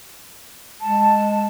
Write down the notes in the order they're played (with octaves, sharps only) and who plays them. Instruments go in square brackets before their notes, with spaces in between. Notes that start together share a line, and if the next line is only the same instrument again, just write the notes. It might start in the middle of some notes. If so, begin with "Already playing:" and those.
[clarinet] G#3 [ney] A5